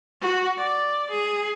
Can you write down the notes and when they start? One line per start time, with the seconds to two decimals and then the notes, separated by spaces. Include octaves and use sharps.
0.21 F#4
0.57 D5
1.10 G#4